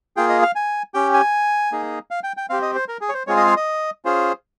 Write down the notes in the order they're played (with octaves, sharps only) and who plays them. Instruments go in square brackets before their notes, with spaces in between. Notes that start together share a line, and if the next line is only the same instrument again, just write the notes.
[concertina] A#3 F4 G#4 G5
D#5
F5
G#5
C#4 G4 G5
G#5
A#3 D#4 G#4
F5
G5
G5
C4 G4 F5
D#5
C5
A#4
G#4
C#5
C5
G#3 C4 F4 G#4 C#5
D#5
F5
D#5
C#4 F4 G#4 C5